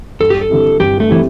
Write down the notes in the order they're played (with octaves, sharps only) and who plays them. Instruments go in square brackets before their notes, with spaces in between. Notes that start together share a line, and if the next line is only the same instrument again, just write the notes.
[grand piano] G2 [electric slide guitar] A4
[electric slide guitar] G4
A4
[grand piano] D3 C4 E4 G4
[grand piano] G2 [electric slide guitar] G4
[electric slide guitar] A3
[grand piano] D3 C4 E4 G4 [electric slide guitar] E3